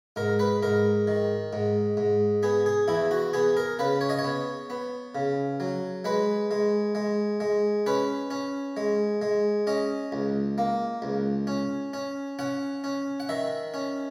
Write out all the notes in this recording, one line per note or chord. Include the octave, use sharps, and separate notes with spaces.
G#2 A#4
B4
G#2 A#4
D#3
G#2
G#2
B3 G#4
G#4
E2 E4
F#4
B3 G#4
A#4
C#3 B4
C#5
D#5
C#5
B3
B3
C#3
F#3
G#3 B4
G#3
G#3
G#3
C#4 B4
C#4
G#3
G#3
C#4 D#5
C#2
A#3
C#2
C#4
C#4
C#4 F#5
C#4
F#5
D#3 E5
C#4